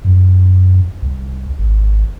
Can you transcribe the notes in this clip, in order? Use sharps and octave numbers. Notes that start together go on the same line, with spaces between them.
F#2
C2
G#1